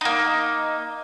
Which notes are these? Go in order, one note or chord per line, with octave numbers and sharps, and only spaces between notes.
A#3 D#4